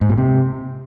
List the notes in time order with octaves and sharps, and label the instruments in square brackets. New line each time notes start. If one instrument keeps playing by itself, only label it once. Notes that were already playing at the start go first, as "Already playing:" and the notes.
[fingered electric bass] G#2
A#2
C3